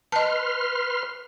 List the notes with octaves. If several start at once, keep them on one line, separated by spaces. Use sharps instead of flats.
B4 D#5 A5 C6 F6